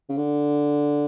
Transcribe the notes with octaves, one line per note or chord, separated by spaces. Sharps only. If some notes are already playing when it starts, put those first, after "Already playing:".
C#3
D3